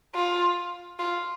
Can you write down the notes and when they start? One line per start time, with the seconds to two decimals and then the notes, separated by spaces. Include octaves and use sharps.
0.15 F4
0.99 F4